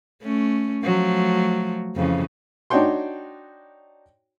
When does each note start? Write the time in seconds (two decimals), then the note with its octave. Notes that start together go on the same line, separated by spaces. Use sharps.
0.22 A3 C#4
0.84 F3 F#3 A3
1.96 F2 C#3 E3
2.70 D4 D#4 F#4 C#5 G5 C6